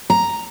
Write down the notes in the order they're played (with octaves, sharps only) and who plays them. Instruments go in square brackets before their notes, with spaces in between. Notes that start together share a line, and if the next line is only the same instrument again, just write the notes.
[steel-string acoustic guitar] A#5